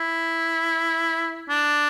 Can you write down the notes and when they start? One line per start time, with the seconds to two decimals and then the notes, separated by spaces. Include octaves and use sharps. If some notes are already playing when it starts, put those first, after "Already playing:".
Already playing: E4
1.49 D4